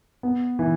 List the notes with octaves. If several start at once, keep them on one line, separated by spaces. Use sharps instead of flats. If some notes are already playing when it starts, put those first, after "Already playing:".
B3
E3